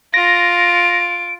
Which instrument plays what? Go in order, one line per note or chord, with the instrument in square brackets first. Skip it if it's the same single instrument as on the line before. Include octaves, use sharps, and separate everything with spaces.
[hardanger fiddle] F4 [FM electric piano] A#6 [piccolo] D7